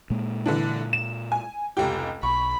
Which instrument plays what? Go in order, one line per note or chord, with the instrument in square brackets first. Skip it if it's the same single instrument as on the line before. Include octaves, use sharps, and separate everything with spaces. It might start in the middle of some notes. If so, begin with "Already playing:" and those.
[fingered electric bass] A#2 G#3 A#3
[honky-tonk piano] D3 E3 D4
E7
G#5
F1 C#2 G4
[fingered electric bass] B1 [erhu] B5 [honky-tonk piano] C#6